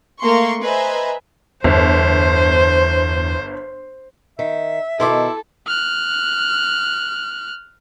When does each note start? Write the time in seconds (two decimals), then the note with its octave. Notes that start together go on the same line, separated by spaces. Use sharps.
0.21 A3 A#3 C6 C#6
0.62 B4 C5 D#5 E5 G#5 A#5
1.64 G1 E2 C5
4.39 D#3 E5
5.00 B2 D#3 E4 A4 C6 D6
5.67 F6 F#6